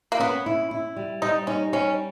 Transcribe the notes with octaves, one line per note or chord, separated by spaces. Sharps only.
A#3
B3 C#4
E4
E4
G3
G3 D#4
C#4 D#4
G3 C#4